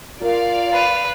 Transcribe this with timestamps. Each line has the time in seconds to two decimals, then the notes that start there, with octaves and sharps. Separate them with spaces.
0.22 F4 A#4 D5 F5
0.73 B4